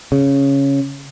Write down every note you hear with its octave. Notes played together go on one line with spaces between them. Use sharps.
C#3